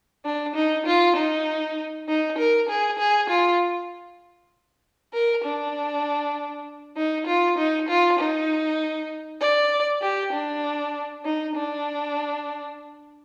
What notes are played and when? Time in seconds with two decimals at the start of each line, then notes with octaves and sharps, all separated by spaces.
0.25 D4
0.56 D#4
0.86 F4
1.16 D#4
2.08 D#4
2.38 A#4
2.69 G#4
2.99 G#4
3.30 F4
5.13 A#4
5.43 D4
6.97 D#4
7.27 F4
7.58 D#4
7.89 F4
8.19 D#4
9.41 D5
10.02 G4
10.33 D4
11.25 D#4
11.55 D4